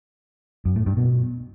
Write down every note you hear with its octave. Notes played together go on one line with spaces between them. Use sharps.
F#2
A2
G2
B2